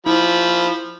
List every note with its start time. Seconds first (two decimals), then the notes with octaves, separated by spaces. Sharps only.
0.06 F3 E4 B5